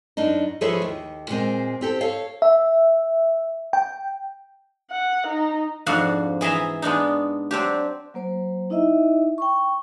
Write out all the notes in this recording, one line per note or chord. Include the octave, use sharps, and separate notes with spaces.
F#2 D4 D#4
F3 G#4 A4 B4 C#5 E5
D#2
A#2 G#3 C4
C4 G4 A4
A4 C#5 F5
E5
G5
F#5
D#4
F2 G#2 F3 D4 F#4 F5
E3 G#4 D#5 E5 A#5
G#3 B3 D4 D#4
F#3 C4 D4 G4
F#3 A#3 C5
D#4 E4 D#5 E5
G5 C#6